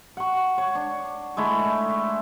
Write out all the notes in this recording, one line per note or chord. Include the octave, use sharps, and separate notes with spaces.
F#5 C#6
C#5
D4
G#3 A3 E4